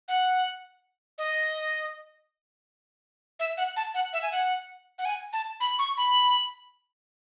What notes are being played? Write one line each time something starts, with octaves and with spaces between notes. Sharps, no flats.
F#5
D#5
E5
F#5
A5
F#5
E5
G#5
F#5
F#5
G#5
A5
B5
C#6
B5